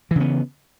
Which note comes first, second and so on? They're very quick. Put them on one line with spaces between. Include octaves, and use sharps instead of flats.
E3 C#3 B3